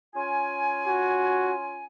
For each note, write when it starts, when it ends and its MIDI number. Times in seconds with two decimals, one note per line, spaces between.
0.15 1.85 61
0.15 1.85 65
0.15 1.85 80
0.87 1.54 66